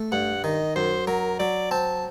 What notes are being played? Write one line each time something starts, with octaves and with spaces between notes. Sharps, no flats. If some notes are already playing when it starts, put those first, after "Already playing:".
Already playing: A3
G2 F#5
D#3 D#5
F#2 C5
F#3 A#4
F#3 D5
C4 A5